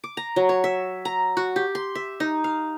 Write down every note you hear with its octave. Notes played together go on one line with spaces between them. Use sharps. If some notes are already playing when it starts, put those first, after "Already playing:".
D6
A#5
F#3
C#5
E5
A#5
F#4
G4
C6
E5
D#4
F5